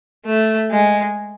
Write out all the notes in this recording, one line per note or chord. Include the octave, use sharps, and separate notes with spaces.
A3
G#3